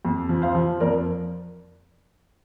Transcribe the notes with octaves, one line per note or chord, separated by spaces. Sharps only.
F2
F3
C5 F5
F3
F2 A#4 D5